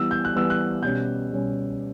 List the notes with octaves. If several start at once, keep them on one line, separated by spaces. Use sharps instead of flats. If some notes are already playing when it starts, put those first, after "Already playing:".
Already playing: E3 G3 B3 E6
G6
F#6
E3 G3 B3 E6
F#6
B2 G3 C#4 G6
B2 G3 C#4